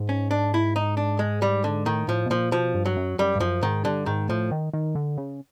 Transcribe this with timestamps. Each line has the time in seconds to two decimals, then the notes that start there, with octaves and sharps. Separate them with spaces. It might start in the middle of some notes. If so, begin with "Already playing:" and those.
Already playing: G#2
0.09 C#4
0.31 D4
0.54 E4
0.76 D#4
0.97 D4
1.19 G#3
1.42 G3
1.64 D3
1.86 A2 D#3
2.08 A2 F3
2.26 B2
2.30 A#2 F3
2.52 B2 F3
2.75 G2
2.85 F#3
2.97 F#2
3.19 F#2 G3
3.36 G2
3.40 F#2 F3
3.63 G#2 D#3
3.85 G2 D3
4.06 G#2 D#3
4.29 A2 F3
4.51 D#3
4.73 D#3
4.95 D3
5.18 C#3